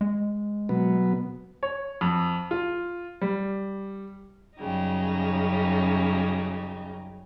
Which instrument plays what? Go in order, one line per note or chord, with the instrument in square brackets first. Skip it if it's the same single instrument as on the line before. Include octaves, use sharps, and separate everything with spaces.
[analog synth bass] G#3
[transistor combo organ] B2 F#3 B3
[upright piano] C#5
F2
F4
G3
[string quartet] F#2 C#3 G3 D#4